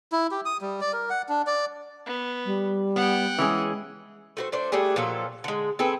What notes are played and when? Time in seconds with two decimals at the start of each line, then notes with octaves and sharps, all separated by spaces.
0.12 E4
0.31 G4
0.45 D#6
0.61 G3
0.81 D5
0.93 A#4
1.10 F#5
1.29 D4
1.47 D5
2.06 B3
2.45 G3
2.96 B3 F#5 G5
3.38 E3 G#3 C#4 G#4
4.37 A3 F#4 C5
4.52 A3 D4 C5
4.72 G3 A3 D4 G#4
4.96 A#2 F3 F#3 A4
5.44 D3 G#3
5.79 C4 G#4 A4 B4